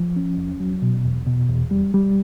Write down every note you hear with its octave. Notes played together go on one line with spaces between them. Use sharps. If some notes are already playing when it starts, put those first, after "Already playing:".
Already playing: F3
C#4
E2
F#3
B2
E2
B2
E2
G3
G3